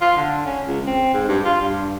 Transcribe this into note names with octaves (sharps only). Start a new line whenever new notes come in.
F4
D3
C#4
C#2
C4
G#2
G2
F4
G2